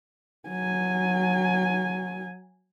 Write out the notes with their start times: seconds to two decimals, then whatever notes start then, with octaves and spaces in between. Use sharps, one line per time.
0.48 F#3 G#5